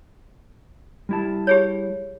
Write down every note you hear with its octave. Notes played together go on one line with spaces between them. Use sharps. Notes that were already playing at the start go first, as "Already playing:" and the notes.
G3 E4 A5
G4 G#4 C#5